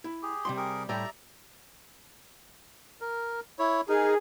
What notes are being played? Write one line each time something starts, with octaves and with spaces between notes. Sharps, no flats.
E4
G4 G#4
C3 G3 C6
G#4 A#4
A2 G3 D5 E5 A#5
A#4
E4 C#5
D#4 G#4 A#4